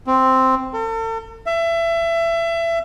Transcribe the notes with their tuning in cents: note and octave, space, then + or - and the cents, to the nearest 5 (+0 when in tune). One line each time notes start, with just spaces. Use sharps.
C4 +0
A4 +40
E5 +25